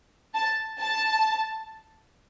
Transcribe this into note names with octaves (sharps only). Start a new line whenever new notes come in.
A5
A5